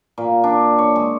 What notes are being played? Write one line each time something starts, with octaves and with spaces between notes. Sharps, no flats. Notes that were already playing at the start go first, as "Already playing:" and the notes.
A#2
D4
C#5
G#3